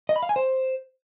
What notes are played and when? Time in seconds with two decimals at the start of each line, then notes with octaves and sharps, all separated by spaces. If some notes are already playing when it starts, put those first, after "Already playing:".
0.09 D#5
0.16 B5
0.23 F5
0.29 G#5
0.36 C5